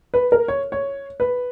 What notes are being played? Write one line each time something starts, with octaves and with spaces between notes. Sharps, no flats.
B4
A#4
C#5
C#5
B4